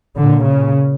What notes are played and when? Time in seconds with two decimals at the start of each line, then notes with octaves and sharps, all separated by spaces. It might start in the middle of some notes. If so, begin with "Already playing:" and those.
0.17 A#2 D3
0.46 C#3